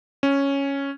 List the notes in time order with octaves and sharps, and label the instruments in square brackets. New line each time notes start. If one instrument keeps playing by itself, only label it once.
[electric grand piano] C#4